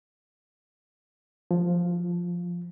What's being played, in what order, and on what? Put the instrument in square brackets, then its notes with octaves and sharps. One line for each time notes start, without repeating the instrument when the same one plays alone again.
[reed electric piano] F3